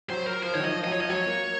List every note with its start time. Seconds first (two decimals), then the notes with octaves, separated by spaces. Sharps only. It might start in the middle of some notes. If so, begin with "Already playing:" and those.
0.10 F#3 C5
0.27 A#4
0.43 F3 C5
0.54 D#3 C#5
0.60 F#3
0.65 F3 D#5
0.76 F3
0.84 F#3 D#5
0.93 C#5
0.99 F3 D#5
1.09 F#3 C#5
1.26 A#3